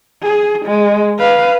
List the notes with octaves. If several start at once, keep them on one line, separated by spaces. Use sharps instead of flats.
G#4
G#3
B4 F5